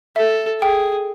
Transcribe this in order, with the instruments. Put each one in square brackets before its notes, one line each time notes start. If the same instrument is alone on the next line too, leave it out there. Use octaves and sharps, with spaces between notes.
[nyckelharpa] A4 [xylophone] E5
[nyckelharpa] G#4 [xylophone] G5